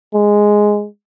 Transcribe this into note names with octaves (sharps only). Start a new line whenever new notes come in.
G#3